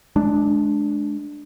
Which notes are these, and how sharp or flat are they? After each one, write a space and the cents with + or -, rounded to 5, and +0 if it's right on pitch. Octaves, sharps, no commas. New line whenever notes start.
G#3 +35 D4 +0